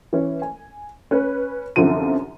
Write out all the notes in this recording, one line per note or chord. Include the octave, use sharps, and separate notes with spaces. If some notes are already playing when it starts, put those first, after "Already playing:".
E3 C#4
G#5
C#4 B4
C2 F#2 D3 F3 D#7